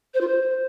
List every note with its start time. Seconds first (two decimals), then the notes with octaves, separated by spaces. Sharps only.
0.14 C5
0.21 F4
0.27 C5